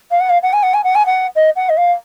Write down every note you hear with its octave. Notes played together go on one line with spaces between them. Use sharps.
F5
F#5
F5
F#5
G#5
F#5
G#5
F#5
G#5
F#5
D#5
F#5
D#5
F5